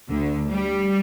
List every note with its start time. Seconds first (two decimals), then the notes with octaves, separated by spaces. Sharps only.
0.10 D2 D3
0.49 G3